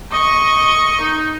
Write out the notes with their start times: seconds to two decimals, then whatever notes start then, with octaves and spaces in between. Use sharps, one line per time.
0.12 D#5 C#6
1.01 D#4